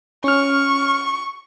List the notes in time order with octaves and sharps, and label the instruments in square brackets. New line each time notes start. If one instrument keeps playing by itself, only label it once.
[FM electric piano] C#4 F6 [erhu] C#6